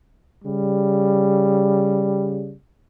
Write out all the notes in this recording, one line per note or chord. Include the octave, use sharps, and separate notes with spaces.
C#3 G3